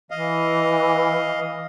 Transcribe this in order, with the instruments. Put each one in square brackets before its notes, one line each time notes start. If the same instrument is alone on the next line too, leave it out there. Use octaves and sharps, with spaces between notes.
[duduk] E3 [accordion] D#5 F5